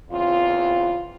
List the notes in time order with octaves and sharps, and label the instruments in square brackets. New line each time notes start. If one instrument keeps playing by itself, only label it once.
[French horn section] E2 C#3 C4 F4